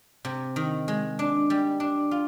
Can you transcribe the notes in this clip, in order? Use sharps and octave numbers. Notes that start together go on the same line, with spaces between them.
C3
D#3
G#3
D4
G3
D4
F4